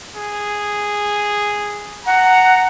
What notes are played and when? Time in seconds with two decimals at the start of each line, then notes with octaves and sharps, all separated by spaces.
0.17 G#4
2.06 F#5 A#5